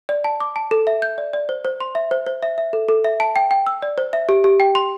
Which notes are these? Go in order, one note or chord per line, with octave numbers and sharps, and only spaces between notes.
D5
A5
D6
A5
A4
E5
G6
D5
D5
C5
C5
C6
E5
C5
C5
E5
E5
A4
A4
E5
A5
G5
G5
E6
D5
C5
E5
G4
G4
G5
C6